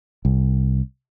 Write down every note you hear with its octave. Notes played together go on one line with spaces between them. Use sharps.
C2